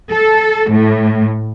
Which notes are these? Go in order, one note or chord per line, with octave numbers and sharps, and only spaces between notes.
A4
A2